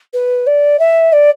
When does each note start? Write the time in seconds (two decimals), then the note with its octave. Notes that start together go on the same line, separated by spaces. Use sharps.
0.13 B4
0.46 D5
0.79 E5
1.12 D5